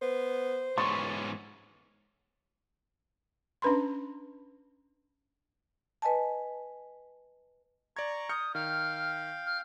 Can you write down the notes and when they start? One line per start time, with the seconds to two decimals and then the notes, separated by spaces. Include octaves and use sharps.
0.02 B3 C5
0.78 G#2 E3 B3 C#5 C6 C#6 A6
3.62 C#4 D4 B4 B5 C6
6.02 B4 D#5 G#5 A5
7.96 D5 A#5 C#6 G#6
8.29 D#6 F6 G6 C#7
8.55 D#3 F5 G5 F6
9.46 F6